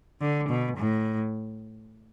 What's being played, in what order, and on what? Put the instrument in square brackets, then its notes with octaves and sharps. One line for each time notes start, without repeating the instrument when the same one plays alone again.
[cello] D3
B2
A2